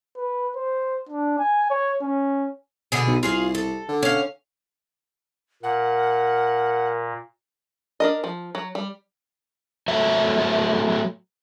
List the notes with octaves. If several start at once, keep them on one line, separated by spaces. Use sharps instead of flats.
B4
C5
D4
G#5
C#5
C#4
B2 D3 G#4
B1
C2 F4 G#4 F5
A4
D3
C#4 F5
A#2 A#4 F#5
D4 A#4 D#5
F3
F#3
G3
F#3 A3 E5